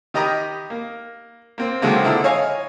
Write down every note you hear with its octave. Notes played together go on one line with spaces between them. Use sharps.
D#3 G4 D#5 A#5 B5 D#6
A#3
A#3 C4
D3 D#3 F#3 G#3 A#3 C4
A#2 D3 E4
C#5 D#5 F5 G#5